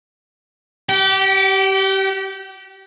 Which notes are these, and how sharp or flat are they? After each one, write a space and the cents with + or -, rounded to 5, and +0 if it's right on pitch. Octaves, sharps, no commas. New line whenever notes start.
G4 -20 G5 -45